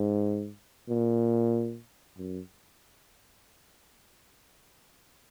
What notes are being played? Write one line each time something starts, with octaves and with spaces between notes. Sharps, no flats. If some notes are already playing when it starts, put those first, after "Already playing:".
Already playing: G#2
A#2
F#2